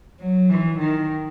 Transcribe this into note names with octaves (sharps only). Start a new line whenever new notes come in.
F#3
E3
D#3